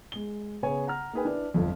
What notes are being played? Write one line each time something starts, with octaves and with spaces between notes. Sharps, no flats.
G#3 G7
C#3 B3 C#5 G#5
F#5 A#5 F6
A#3 D#4 G#4 B4 G5 G#5
D4 E4 B4 D5
G1 F2